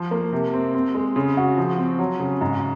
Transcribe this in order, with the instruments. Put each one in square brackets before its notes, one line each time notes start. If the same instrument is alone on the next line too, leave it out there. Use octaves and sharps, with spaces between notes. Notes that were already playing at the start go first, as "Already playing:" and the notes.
Already playing: [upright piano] F3
A#3
C3
C4
C4
G#3
C#3
F#4
F3
C4
F#3
C#3
G#2